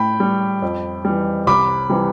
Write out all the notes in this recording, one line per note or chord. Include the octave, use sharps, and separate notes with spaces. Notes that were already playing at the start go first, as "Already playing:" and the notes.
Already playing: A2 G5 B5
G3
F2
E3 G3
C2 B5 D6
C3 E3 G3